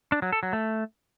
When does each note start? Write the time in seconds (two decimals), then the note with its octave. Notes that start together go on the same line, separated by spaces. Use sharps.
0.12 D4
0.22 F#3
0.32 A4
0.43 F#3
0.53 A3